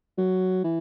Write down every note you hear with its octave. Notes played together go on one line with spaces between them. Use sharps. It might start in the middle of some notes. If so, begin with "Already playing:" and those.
F#3
E3